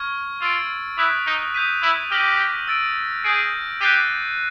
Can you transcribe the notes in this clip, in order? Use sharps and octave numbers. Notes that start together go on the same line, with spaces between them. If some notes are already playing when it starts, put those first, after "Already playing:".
Already playing: C#6 F6 G#6
F4 E6 A6 D7
E4 D#6 F#6 B6
D#4
D#6 G6 B6 D#7
E4
G4 F6 A#6 D#7 F#7
E6 A6 D7
G#4 G6 A#6 D7
G4 F#6 A6 C7 D#7